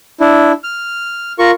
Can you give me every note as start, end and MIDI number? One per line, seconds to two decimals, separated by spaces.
0.20 0.52 62
0.20 0.52 64
0.64 1.33 89
1.39 1.51 65
1.39 1.51 70
1.39 1.51 85